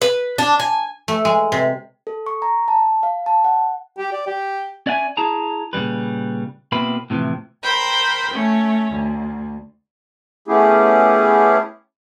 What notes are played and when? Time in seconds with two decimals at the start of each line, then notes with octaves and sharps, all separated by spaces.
0.02 B4
0.38 D4
0.60 G#5
1.08 A3
1.25 G#3
1.52 C3
2.07 A4
2.26 C#6
2.42 A#5
2.68 A5
3.03 F5
3.26 A5
3.44 F#5
3.98 G4
4.13 D5
4.27 G4
4.86 C#4 D5 E5 F#5 G#5
5.17 E4 G#4 A5 A#5
5.73 A#2 C#3 E3 G3 B4
6.72 B2 A#3 C4 E4 B4 B5
7.10 A2 C3 E3 F3
7.61 A#4 C5 G5 B5
8.31 A3 C#4
8.93 D2
10.48 A3 B3 C#4 E4 G4 G#4